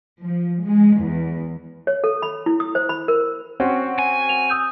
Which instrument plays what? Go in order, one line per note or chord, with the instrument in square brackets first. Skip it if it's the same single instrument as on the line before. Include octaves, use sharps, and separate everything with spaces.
[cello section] F3
G#3
E2
[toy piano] C#5
A4
B5
E4
D#6
C5
B5
A#4
[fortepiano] C4 C#4 F#4
[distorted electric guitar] G#5
[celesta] F7
D#6 E6 G6